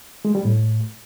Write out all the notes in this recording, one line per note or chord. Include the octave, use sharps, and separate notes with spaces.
G#3
G3
A2